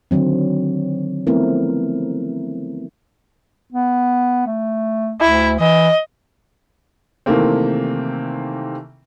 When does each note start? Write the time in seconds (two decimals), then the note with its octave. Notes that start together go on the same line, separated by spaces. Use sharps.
0.11 D3 D#3 F#3 C4
1.27 F3 A3 B3 C4 E4 A#4
3.72 B3
4.46 A3
5.21 D2 E4
5.60 E3 D#5
7.26 C3 D#3 E3 A3 A#3 C4